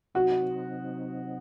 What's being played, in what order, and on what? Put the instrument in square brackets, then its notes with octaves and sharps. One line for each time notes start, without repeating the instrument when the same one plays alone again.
[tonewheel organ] C3 F#3 C4 D#4 [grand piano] F#4